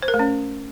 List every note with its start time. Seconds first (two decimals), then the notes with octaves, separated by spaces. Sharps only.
0.03 C5
0.08 A#4
0.14 A3
0.19 C#4